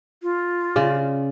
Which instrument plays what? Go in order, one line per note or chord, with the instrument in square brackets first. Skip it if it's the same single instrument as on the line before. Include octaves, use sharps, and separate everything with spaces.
[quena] F4
[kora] C#3 D5